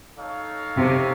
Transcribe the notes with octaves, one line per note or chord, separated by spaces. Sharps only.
D#4 A4 C#5 F5
C3